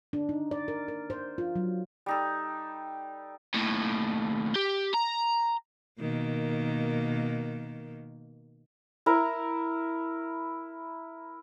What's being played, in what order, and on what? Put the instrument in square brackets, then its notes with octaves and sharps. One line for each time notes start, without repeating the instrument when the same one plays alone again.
[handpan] D4
D#4
D5
A#4
A#4
C5
F4
F#3
[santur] G3 D#4 A4
[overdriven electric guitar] D#2 A2
G4
A#5
[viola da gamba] B2 D#3 A#3
[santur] E4 A#4 A#5